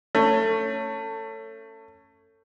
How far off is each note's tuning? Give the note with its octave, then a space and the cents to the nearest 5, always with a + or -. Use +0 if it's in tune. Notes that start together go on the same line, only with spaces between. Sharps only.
A3 +25 C#4 +0